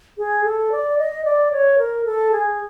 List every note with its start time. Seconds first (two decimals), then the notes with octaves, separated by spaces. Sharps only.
0.18 G#4
0.44 A4
0.72 D5
0.98 D#5
1.25 D5
1.52 C#5
1.78 A#4
2.05 A4
2.32 G#4